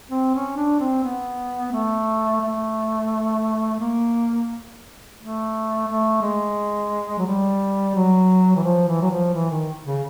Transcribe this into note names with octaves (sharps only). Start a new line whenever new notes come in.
C4
C#4
D4
C4
B3
A3
A3
A#3
A3
A3
G#3
F#3
G3
F#3
E3
F3
E3
F#3
F3
E3
D#3
C#3